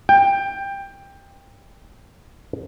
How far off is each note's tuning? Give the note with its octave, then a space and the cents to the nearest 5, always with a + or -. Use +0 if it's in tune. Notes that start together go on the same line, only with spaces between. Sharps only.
G5 +15